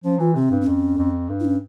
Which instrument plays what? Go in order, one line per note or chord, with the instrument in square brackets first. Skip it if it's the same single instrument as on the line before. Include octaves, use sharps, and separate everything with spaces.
[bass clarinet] F3 [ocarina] C#4
[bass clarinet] E3 [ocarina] F4
[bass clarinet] C3 [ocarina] C4
[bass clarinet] G2
[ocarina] C4
[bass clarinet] F2 [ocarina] C#4
[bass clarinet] F2
G2
[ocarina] E4
C#4